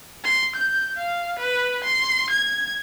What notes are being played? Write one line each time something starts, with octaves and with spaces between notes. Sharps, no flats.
C6
G6
F5
B4
C6
G#6